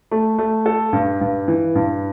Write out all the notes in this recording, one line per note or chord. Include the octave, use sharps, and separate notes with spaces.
A3
A3
A4
G2
G2
E3
G2